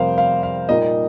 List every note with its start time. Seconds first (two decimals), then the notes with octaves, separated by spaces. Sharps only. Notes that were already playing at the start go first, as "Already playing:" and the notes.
Already playing: F2 C3 G3 A#4 C5 F5
0.18 F5
0.43 F5
0.69 A#2 G3 A#3 D#4 D#5